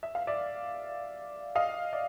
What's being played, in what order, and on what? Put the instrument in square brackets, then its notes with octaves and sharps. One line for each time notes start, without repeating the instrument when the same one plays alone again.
[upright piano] E5
F5
D5 E5
D#5 F5
D5 E5